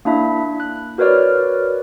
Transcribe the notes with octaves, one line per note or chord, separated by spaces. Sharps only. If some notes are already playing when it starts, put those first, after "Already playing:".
A#3 D4 E4 E5
F#6
F#4 A#4 B4 C#5 D5 F6